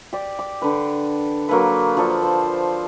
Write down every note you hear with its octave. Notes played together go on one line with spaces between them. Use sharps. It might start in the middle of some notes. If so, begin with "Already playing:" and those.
G4 D5
D6
D3 B4
F#3 A#3 A4 B4
F3 A4 D5
C5